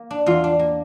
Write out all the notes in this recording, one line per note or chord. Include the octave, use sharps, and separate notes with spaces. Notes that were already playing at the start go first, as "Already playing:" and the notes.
Already playing: A#3
D4
E2 F4
D4
A#3